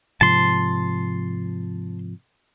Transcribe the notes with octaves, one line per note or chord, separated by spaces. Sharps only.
G#2 C3 F3 A5 C6